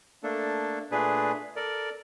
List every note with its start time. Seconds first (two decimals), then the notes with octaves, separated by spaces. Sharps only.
0.23 A3 A#3 D4 A4
0.91 A#2 A3 D4 G#4 B4
1.56 A4 A#4 D5